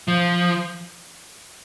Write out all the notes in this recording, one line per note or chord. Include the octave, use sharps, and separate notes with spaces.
F3